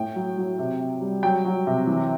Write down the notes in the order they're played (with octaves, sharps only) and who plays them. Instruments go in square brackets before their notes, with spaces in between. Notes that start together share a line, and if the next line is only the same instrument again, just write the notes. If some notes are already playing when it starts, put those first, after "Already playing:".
Already playing: [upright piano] A2 G5
F#3
F#3
C3
C3
G3
F#3 G5
F#3
C3
E3